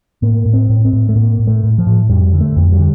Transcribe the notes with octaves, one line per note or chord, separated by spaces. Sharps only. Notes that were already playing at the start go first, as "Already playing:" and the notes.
A2 A#3
A2
C4
A2
C4
A2
A3
A2 A#3
A2
A3
A2
F3
A2
F2 G3
D3
A3
F2
G3
D3